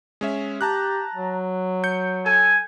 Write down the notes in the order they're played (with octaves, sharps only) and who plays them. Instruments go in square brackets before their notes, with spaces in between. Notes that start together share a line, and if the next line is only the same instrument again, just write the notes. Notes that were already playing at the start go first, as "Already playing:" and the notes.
[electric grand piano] G#3 C#4 E5
[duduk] G4 [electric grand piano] A5 A#5 F#6
[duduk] F#3
[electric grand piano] G6 C#7
[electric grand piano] A4 [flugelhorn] G#5